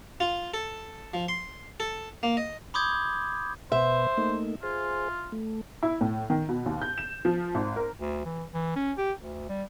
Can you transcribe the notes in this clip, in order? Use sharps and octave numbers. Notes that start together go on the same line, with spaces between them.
F4
A4
F3
C6
A4
A#3
D#5
B5 C6 D6 D#6 G6 G#6
B2 B4 C5 E5
A3 A#3 D#4
F4 G#4 C5
A3
E4
A2
D#3
B2
D#2
G6
E7
F3
G#1
A#4
D2
E3
E3
C#4
G4
D2
G3